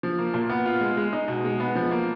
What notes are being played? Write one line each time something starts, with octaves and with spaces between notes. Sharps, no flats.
F3
A#3
A#2
B3
F4
G#3
G#3
D#4
B2
G#3
B3
F3
A#3